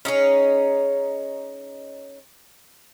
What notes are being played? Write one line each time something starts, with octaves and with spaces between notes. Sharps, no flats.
C#4 D#4 G#4 C#5